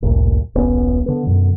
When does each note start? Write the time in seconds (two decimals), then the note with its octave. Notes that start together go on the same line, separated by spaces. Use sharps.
0.03 A1 D2 G2 A#2
0.55 D#1 B1 B3 C#4
1.06 D3 B3
1.27 F#2 B2 D3